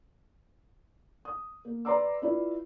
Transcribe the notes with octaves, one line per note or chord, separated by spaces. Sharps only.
D#6
A#3
B4 D5 A#5 C6 D6 E6
E4 F4 B4 D5